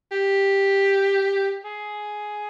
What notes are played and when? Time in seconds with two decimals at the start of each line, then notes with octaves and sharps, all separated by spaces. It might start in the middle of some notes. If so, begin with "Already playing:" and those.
0.12 G4
1.65 G#4